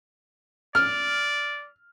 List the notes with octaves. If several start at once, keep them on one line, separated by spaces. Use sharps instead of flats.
D5 F6